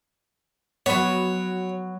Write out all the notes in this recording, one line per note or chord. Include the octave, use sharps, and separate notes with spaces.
F#3 B3 C#5